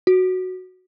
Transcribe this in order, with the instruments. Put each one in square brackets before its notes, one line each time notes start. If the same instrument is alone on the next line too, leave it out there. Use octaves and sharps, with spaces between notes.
[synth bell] F#4